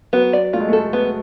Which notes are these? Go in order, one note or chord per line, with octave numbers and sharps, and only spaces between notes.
F#3 B3
D5
A3 F4
G#3
A3
A4
B3